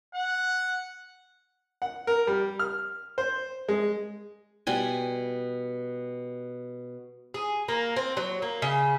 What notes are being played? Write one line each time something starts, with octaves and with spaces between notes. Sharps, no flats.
F#5
F#5
A#4
G3
F6
C5
G#3
B2 G3 G#5
G#4
A#3
C4
F#3
A#3
C#3